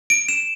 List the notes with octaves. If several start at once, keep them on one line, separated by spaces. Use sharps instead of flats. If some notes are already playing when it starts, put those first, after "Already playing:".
D7
E7